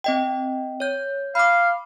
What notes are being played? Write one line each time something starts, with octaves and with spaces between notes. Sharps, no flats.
C4 D#5 G5
C#5 G6
F5 B5 D6